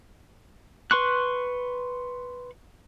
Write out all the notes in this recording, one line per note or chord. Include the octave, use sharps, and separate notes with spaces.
B4 C6 C#6 F#6